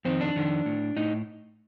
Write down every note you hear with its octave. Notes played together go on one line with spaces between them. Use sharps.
F2 D#3 C4
D4
F2 D#3
A2
A2 D#4